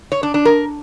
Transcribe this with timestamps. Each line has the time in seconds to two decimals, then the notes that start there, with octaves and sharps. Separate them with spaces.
0.12 C#5
0.23 D4
0.34 D4
0.45 A#4